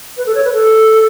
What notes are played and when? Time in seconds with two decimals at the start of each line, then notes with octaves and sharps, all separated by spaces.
0.17 B4
0.26 A4
0.35 C#5
0.44 B4
0.53 A4